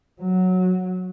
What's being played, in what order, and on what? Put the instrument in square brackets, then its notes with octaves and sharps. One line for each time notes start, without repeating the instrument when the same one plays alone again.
[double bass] F#3